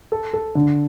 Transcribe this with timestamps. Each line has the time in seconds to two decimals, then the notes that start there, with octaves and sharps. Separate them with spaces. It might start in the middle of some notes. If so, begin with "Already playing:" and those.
0.12 A4
0.33 A4
0.55 D3